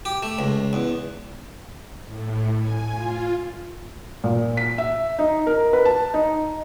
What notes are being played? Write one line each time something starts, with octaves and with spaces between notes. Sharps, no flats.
G4
A3
C#2
E2
A2
G#5
F4
A#2
B6
E5
D#4
A#4
B4
A5
D#4